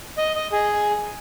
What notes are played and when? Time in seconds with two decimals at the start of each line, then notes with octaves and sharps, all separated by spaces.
0.17 D#5
0.35 D#5
0.52 G#4